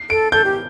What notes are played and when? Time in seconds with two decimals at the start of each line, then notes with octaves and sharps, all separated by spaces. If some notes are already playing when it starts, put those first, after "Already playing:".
Already playing: C7
0.10 A4 D7
0.32 A4 G6
0.45 G4